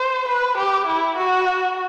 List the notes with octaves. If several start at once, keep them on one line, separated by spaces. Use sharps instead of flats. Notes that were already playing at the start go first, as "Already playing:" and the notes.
Already playing: C5
B4
G4
E4
F#4